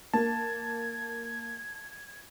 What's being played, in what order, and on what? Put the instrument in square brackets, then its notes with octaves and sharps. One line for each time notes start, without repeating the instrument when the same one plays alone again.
[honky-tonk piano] A#3 [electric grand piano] A5 [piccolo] G#6